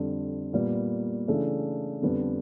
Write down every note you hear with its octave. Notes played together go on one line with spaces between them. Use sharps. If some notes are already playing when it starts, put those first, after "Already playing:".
Already playing: F2 D3 G3
A#2 G3 B3
C#3 E3 A3 D4
F2 D3 G3 B3